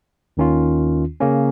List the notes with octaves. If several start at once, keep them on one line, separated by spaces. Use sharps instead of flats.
D#2 D#3 C#4 F4
C#3 A#3 C#4